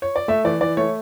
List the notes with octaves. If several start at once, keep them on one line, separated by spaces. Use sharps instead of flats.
C#5
D5
A3 E5
E3 D5
E3 D5
A3 C#5